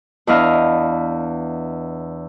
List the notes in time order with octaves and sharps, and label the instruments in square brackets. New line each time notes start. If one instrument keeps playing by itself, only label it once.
[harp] E2 D4 E4 D#5 F5 F6